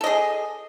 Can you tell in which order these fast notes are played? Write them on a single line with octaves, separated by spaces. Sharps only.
A4 D#5 G#4